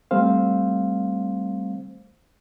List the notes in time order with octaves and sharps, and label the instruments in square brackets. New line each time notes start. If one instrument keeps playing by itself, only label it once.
[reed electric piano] G3 A3 C4 C5 F5